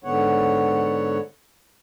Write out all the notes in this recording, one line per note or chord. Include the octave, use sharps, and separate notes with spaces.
G#2 D3 B3 C#5 F#5